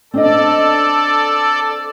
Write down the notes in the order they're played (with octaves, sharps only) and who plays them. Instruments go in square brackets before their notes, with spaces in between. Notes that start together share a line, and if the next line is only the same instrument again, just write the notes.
[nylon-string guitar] C4 D4 D#5 [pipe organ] A4 D5